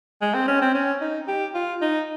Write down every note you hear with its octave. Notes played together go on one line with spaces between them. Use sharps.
G#3
C4
C#4
C4
C#4
D#4
G4
F4
D#4